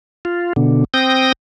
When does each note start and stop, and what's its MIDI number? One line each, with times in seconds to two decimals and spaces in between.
0.25 0.53 65
0.56 0.84 47
0.56 0.84 50
0.94 1.32 60
0.94 1.32 79
0.94 1.32 87
0.94 1.32 94